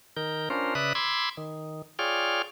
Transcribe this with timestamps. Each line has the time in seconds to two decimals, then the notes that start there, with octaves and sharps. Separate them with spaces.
0.17 D#3 A#4 G6
0.50 C#4 D4 F4 A#4 C5
0.75 C#3 B4 D5 E5 D#6 F#6
0.95 B5 C6 D6 E6 G#6
1.37 D#3
1.99 F4 G#4 C#5 D5 G5 F6